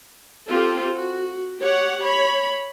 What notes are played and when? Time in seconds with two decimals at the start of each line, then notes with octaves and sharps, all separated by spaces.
0.51 C4 F4 G4 A4
0.94 F#4
1.61 G4 C#5 F#5
2.05 C#5 B5